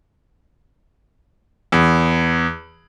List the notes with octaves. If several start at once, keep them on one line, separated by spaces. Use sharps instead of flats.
E2